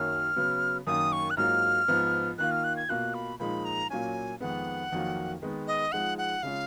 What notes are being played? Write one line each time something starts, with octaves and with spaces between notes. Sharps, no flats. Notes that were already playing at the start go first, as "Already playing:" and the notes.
Already playing: F#2 D#3 F#3 A#3 C#4 F6
C#3 F#3 B3
F#2 D#3 A#3 D#6
C#6
F#6
G#2 F#3 A#3 F4 F6
G#2 F3 B3
D#3 A#3 F4 F#6
F6
F#6
G#6
B2 A#3 F4 F#6
B5
A#2 F3 G#3 D#4 B5
A#5
A#2 F#3 A#3 C#4 G#5
F2 D#3 G#3 B3 F#5
F2 D#3 F#3 A#3
D#3 G#3 B3
D#5
F3 G#3 D#4 F#5
F#5
C#3 G#3 C#4 F4 F5